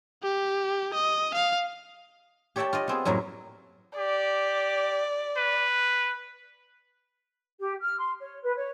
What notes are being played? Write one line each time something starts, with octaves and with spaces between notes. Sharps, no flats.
G4
D#5
F5
G4 C#5 D5 E5 G5 A5
F4 D5 D#5
B3 C4 G#4
F#2 A2 F#3 G3 A#3
G4 D5
B4
G4
F6
C6
C#5
B4
C#5